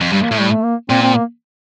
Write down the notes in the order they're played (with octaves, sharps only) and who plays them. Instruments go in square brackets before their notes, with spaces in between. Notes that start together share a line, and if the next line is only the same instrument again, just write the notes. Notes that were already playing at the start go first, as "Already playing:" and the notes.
[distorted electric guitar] F2
[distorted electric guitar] G2 [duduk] G3
[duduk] A#3
[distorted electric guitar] A2 [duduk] A3
[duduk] G3
A3
A#3
[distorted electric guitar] A#2 [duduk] C4
[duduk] C4
A#3